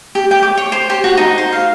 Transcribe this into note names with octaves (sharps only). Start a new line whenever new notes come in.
G4
G5
D6
C#5
C5
G4
F#4
D#4
C5
F5